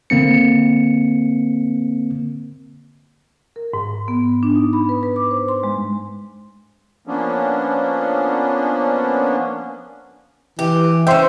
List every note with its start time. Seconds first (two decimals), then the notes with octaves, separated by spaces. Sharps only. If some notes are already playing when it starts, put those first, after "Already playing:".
0.10 D3 A#3 C4 C#7
3.56 A#4
3.73 G#2
4.08 B3
4.43 D4
4.56 D#4
4.73 B5
4.89 B4
5.03 B4
5.16 D6
5.31 C5
5.48 C6
5.63 G#3
7.07 F3 A#3 B3 C#4 D4
10.59 E3 G4
11.07 C#4 C5 E5 G5 C6